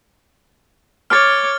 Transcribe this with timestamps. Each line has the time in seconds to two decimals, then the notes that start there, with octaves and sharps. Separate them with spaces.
1.10 C#5 D6 F6 A6